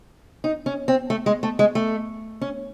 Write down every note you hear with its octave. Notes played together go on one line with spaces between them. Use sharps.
D#4
C#4
C4
A3
G#3
A3
G#3
A3
C#4